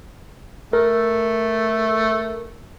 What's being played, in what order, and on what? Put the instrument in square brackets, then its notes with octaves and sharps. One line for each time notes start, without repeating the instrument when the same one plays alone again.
[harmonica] A3 [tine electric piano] A#4